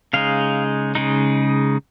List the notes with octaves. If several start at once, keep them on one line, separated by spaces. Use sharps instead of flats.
C#3 G#3 D#4 F5
C#3 G#3 D#4